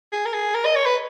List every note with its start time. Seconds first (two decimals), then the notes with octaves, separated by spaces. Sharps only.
0.12 G#4
0.26 A#4
0.33 G#4
0.54 A#4
0.65 D#5
0.76 C#5
0.86 B4